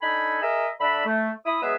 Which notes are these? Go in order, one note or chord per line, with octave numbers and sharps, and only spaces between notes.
D4 D#4 A4 G#5 B5
G#4 A#4 D#5 E5
D3 D4 E5 B5
A3
E4 B5 D#6
F#3 G#3 B3 G#4 B4 E5